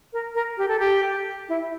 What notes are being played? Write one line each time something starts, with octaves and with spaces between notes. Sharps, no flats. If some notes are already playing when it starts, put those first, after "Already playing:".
A#4
A#4
G4
A4
G4
E4